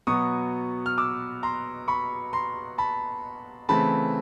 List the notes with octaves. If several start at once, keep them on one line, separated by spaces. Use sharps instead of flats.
B2 F#3 B3 C#6 D#6
F6
D6 E6
A#5 C6
B5 C#6
A#5 C6
A5 B5
C#3 E3 A3 C4 A5 B5